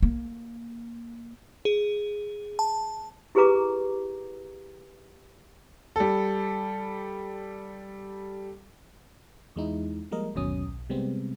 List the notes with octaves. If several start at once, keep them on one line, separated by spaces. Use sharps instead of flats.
A#3
G#4
A5
E4 G4 G#4 B4 A#5 D6
G3 A4
E2 G#3 D#4 E4
F3 G3 G#3 A#3 A#4 D#5
G1 D#2 B2 F#3 C#4 D#6
B1
C3 G3 G#3 B3 C4